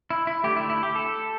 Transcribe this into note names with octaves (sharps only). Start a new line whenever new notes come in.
E4
E4
D3 A3 G4
E4
E4
G4
A4